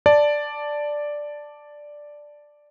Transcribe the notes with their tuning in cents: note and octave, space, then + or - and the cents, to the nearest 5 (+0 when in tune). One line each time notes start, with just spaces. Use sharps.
D5 +0 A5 +0